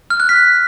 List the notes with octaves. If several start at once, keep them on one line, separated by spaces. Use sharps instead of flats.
F6
F#6
B6